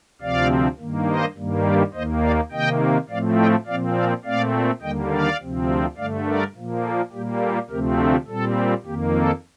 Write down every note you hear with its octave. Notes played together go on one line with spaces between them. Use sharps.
D2 C3 F3 C4 D5 F5
G2 D#3 A#3
C5 D#5
G2 D#3 G3 A#3
A#4 D5
D#2 D#3 A#3 C5 D#5
D5 F5
C3 D#3 A#3 D#5 G5
A2 F3 A3 C4 D5 F5
D#5 G5
A#2 F3 C4 D5 F5
D5 F5
A#2 A3 C4 D5 F5
D#2 D3 G3 A#3 D#5 G5
D5 F5
D2 C3 F3 C4
G2 D3 A3 D5 F5
A#4 D5
A#2 F3 A#3
A4
A#2 G3 A#3 G4
A4
D2 C3 F3 A3 C4 G4 A#4
G4
A#2 G3 C4 A4
F2 D#3 A#3 G4
A4